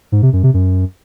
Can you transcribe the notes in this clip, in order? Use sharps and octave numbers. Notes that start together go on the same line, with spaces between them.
G#2
C3
F#2
C3
F#2